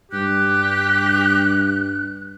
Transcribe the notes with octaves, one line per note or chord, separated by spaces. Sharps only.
G2 G4 F#6